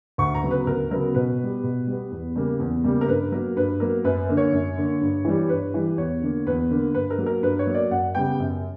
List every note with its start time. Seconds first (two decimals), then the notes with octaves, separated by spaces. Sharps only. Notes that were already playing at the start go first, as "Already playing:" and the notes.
0.18 D2 C#6
0.35 A#5
0.43 C#3 F#3 B3
0.51 B4
0.67 D2 A#4
0.90 C#3 F#3 B3 A#4
1.15 B2 B4
1.39 B3
1.44 G3
1.63 B2
1.87 G3 B3
2.11 E2
2.36 C#3 G3 A#3
2.59 E2
2.84 C#3 G3 A#3
3.01 A#4
3.08 G2 B4
3.32 F#3 A#3 A#4
3.56 G2 B4
3.80 F#3 A#3 A#4
4.04 F#2 B4
4.29 D3 A#3
4.37 C#5
4.52 F#2
4.77 D3 A#3
5.01 G2
5.25 E3 G3
5.49 G2 B4
5.74 E3 G3
5.98 E2 C#5
6.22 D3 A#3
6.46 E2 B4
6.70 D3 A#3
6.94 G2 B4
7.10 A#4
7.18 F#3 A#3
7.26 A#4
7.43 G2 B4
7.59 C#5
7.67 F#3 A#3
7.74 D5
7.91 F#2 F#5
8.15 C#3 G3 B3 G5
8.39 F#2